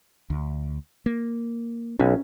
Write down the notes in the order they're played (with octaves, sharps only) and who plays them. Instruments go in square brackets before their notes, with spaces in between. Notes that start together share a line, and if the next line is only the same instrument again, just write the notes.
[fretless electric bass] D2
A#3
[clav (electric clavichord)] B1 [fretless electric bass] C#4